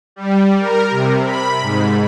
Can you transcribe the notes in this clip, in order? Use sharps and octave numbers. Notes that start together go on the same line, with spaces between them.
G3
A#4
C3
B5
G#2